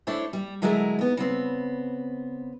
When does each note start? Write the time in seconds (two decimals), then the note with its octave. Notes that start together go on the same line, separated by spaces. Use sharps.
0.07 A3 D4 E4 C5 C#5
0.33 G3
0.62 D3 F#3 G#3 A3 E4 A#4
0.99 D#2 B3
1.17 C#3 B3 C4